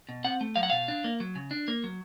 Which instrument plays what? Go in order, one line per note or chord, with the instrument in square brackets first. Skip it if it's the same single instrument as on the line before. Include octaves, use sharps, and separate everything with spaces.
[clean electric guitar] B2
C4 F#5
A3
F#3 F5
F#5
B2 F5
D4
A#3
F#3
C#3
D4
A#3
F#3